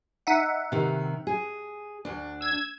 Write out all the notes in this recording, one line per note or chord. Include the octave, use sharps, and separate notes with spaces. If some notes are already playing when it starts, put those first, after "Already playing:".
D#4 E5 F#5
C3 D#3
G#4
D2 D4
E6 G#6